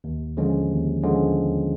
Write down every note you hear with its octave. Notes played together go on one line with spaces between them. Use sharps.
D#2
D3 F3 G#3 C#4
D#2
D3 F3 G#3 C#4